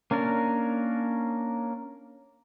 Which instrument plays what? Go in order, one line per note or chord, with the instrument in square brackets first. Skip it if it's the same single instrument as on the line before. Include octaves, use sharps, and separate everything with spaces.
[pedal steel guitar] A#3 C#4 D4 A#4